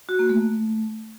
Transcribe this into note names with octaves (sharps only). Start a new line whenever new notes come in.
F#4
A#3
A3